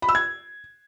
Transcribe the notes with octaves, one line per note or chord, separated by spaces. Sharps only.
B5
E6
G#6